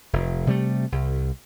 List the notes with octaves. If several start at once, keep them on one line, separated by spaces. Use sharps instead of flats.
F1
C3 G3 A3
C2